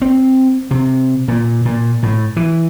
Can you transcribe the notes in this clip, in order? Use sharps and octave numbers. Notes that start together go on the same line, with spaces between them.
C4
C3
A#2
A#2
A2
E3